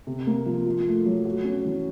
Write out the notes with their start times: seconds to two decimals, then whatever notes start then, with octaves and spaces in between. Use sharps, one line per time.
0.07 C3
0.27 A#3
0.46 F3
0.66 F4
0.86 A3
1.05 F#3
1.25 F#4
1.44 C#4
1.65 E3